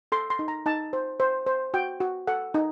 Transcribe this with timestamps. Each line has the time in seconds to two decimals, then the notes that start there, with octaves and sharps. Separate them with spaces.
0.12 A4 C6
0.30 C6
0.39 D#4
0.48 A#5
0.66 D#4 A5
0.93 C5
1.20 C5
1.47 C5
1.74 F#4 G5
2.00 F#4
2.27 A4 F#5
2.54 D#4